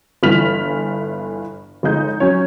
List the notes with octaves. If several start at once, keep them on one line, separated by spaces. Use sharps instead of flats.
G1 G2 E3 F6 B6 F7
G1 G#3 D#4 G6
F#3 C#4 C#5